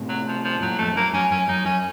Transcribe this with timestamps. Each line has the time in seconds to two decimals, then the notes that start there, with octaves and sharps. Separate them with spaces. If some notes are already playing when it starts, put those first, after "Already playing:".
Already playing: A2 C3
0.09 F#3
0.27 F3
0.45 F3
0.61 F#2 A#2 F#3
0.78 F2 A2 A3
0.96 F#2 A#3
1.13 F#2 C#4
1.31 F#2 C#4
1.49 F#2 D#4
1.66 F#2 C#4